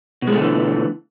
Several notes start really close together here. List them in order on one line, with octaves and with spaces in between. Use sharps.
B2 G#3 A3 D3 E3